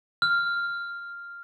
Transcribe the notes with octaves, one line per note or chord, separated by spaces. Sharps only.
F6